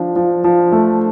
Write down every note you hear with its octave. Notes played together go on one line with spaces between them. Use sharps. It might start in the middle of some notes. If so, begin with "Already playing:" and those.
Already playing: F3 D4
F3
F3
A3